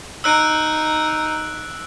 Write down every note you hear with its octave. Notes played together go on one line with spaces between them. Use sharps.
D#4 E6 F#6 D7